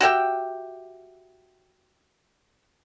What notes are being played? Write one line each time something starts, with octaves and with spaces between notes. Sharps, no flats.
F#4 G4 E5 G5